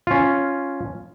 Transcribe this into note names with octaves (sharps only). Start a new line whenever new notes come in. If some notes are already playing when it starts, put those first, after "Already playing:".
C#4 F4